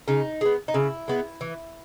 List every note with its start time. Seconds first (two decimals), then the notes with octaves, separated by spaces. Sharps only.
0.08 C#3 D#4
0.41 G#3 B3
0.68 D#4
0.74 C#3 E4
1.08 G#3 B3
1.41 E3